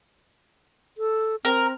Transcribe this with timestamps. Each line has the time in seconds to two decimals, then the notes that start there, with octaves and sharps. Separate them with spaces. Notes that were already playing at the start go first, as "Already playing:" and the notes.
0.98 A4
1.45 C4 A#4